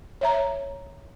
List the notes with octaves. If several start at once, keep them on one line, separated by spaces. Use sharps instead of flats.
C#5 E5 A#5